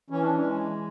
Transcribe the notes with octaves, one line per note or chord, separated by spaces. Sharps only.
E3 C#4
D4
C#4
G#3